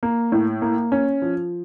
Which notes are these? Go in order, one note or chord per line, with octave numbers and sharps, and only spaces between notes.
A#3
A2
A#3
C#4
F3